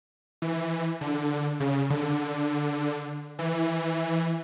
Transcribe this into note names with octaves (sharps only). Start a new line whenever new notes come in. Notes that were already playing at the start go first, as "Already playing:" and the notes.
E3
D3
C#3
D3
E3